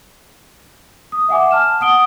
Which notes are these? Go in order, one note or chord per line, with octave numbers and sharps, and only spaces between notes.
D#6
E5 F#5 G#5 D6
A5 F6 E7
F#5 D#6 D7 G7